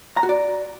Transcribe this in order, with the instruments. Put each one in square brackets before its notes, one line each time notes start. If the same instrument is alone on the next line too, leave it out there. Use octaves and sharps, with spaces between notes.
[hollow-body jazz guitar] A#5
F#4
D5